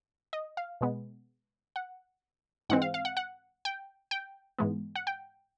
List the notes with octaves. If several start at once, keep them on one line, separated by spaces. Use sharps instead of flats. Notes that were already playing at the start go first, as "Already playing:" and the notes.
D#5
F5
B2 G#3 B3
F#5
G#2 E3 G#3 C4 F#5
F5
F5
F#5
F#5
G5
G5
G#2 E3 G#3 B3
F#5
G5